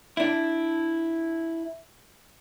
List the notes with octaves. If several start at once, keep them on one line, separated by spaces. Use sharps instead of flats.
D4 E4